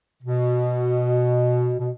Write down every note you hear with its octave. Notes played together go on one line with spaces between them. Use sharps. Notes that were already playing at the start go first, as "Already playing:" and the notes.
B2
B2